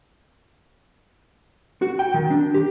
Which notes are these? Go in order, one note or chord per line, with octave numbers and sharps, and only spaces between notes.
F#4
G5
D#3
D4
G4